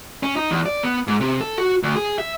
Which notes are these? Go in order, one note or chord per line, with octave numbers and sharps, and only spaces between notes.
C#4
D#4
E2
D5
B3
G#2
C3
A4
F#4
D2
G#4
E5